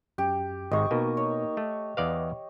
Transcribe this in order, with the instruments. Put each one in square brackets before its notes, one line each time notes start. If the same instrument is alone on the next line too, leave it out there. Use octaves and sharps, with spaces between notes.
[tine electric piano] F#2 [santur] G4
[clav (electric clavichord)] G#1 G#2 [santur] D#5 C#6
[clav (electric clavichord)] B2 [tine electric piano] A#3 D#4 A#4
[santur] C#5
[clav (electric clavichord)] A3
[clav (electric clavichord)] E2 D5 F5 [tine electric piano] B4 D#5